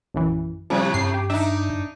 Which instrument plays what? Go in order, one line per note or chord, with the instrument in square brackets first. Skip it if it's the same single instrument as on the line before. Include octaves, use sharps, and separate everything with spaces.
[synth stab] A#1 F#2 E3
[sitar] A2 C3 [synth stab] F3 G3
[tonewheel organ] G2 [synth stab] C7
[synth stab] G4
[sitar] D4 D#4 [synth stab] E5